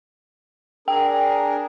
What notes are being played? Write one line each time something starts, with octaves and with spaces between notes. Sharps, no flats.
D4 G#4 A#4 G5